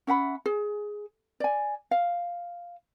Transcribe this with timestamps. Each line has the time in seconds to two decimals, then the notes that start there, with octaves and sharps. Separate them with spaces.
0.07 C#4 E5 F#5 B5
0.46 G#4
1.40 D5 G#5
1.91 F5